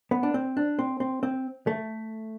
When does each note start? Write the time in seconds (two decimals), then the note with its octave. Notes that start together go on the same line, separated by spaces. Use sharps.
0.11 B3
0.23 D4
0.34 C4
0.57 D4
0.79 C4
1.00 C4
1.23 C4
1.67 A3